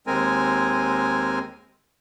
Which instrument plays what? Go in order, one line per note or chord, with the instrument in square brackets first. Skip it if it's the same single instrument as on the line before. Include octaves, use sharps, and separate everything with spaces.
[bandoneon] D#2 G#3 C4 A#4 G#5